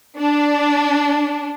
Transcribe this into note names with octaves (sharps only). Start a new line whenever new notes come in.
D4